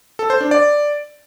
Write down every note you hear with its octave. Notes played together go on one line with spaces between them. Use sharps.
A4
C5
D4
D5